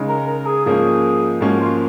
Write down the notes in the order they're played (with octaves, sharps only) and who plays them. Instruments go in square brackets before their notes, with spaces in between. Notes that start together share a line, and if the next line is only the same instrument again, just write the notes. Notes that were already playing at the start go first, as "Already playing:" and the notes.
Already playing: [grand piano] C#3 G#3 D#4
[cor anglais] A#4
A#4
G#4
[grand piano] G#2 F3 A#3 C#4 [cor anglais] G#4
[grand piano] G#2 F3 A#3 C#4 [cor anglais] F#4
[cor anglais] F4